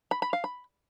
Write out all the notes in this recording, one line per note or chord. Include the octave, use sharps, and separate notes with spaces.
B5
B5
F5
B5